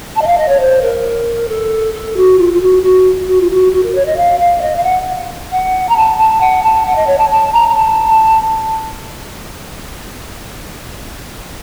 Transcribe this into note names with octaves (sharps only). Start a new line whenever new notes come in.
A5
D#5
F5
D#5
C#5
C5
A#4
A4
A4
F#4
F4
F4
F#4
F#4
F#4
F4
F#4
F#4
A#4
C#5
D#5
F5
F5
D#5
F5
F#5
F#5
A#5
A5
A5
F#5
A5
F#5
D#5
C#5
A5
A5
A#5
A#5
A5